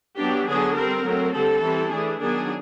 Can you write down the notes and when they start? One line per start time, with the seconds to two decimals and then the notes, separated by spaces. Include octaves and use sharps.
0.18 F#3 B3 D4 G4
0.47 D3 F#3 B3 D4 G#4
0.75 G3 C4 A#4
1.04 F#3 A3 C4
1.33 D3 G3 C4 A4
1.62 E3 G3 C4
1.90 E3 A3 D4 G#4
2.19 D#3 F#3 B3 D4 G#4